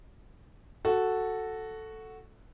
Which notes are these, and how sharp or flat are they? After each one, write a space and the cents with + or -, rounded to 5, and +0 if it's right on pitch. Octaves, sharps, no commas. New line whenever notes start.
F#4 +0 A4 +0